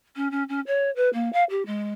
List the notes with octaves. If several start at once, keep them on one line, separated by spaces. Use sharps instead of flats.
C#4
C#4
C#4
C#5
B4
A#3
F5
G4
G#3